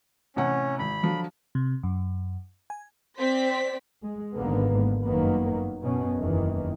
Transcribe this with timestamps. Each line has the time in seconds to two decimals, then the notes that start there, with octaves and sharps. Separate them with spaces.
0.36 A1 C3 C#4 F#5
0.79 G#1 B5
1.03 D3 F3 F#3
1.55 C3
1.83 F#2
2.70 G#5
3.18 C4 C5 D5 B6
4.03 G#3
4.35 G#1 G#2 D3 A#3 B3
5.03 G1 F#2 D#3 F#3 A#3 B3
5.81 F#2 B2 C#4
6.18 F#1 E2 D#3 E3